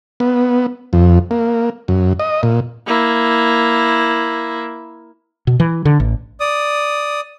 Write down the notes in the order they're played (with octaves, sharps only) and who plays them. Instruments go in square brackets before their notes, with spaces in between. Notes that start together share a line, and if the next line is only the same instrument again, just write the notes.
[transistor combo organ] B3
F2
A#3
F#2
D#5
A#2
[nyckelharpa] A#3 E4
[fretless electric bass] B2
E3
D3
A1
[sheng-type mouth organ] D5 D#6